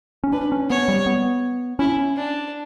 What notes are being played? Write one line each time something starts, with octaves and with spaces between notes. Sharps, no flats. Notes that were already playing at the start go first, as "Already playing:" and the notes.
C#4
D4 B4
C#4
B3 C#5
G3
B3
C#4 E4
D4